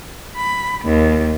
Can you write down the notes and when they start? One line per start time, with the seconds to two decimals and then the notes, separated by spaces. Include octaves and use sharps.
0.37 B5
0.86 D#2